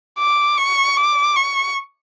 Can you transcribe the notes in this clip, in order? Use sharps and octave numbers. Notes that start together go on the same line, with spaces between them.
D6
C#6
D6
C#6